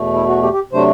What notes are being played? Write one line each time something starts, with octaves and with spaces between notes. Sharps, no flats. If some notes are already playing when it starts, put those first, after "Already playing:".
Already playing: E2 B2 A3
E4
F#4
G4
G4
C3 F#3 A3 D4 C5